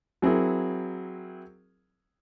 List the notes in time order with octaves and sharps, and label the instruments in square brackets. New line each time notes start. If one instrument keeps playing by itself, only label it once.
[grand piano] F#3 C4 E4 G#4 A#4